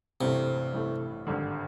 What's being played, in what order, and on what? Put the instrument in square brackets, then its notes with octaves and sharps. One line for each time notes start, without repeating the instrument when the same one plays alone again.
[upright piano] A1 G2 E3 A3 [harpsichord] C3
[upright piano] A1 G2 E3 A3
G#1 G2 D3